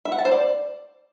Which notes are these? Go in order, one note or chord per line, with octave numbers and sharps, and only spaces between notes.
E5
F#5
A5
C5
D5